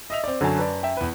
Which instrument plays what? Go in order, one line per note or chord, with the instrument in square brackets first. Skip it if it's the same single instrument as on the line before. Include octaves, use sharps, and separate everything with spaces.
[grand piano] D#5 E5 F7
C4 D5
[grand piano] F#2 A5 [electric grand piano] D3 F#3 G#5
[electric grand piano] B4 D5
E5 G5
[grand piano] E2 B4